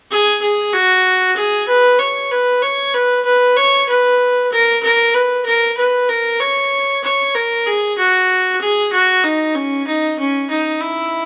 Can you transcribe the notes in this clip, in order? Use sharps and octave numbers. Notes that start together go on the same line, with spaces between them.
G#4
G#4
F#4
G#4
B4
C#5
B4
C#5
B4
B4
C#5
B4
A#4
A#4
B4
A#4
B4
A#4
C#5
C#5
A#4
G#4
F#4
G#4
F#4
D#4
C#4
D#4
C#4
D#4
E4